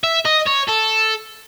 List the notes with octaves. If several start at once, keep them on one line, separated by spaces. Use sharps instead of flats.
E5
D#5
C#5
A4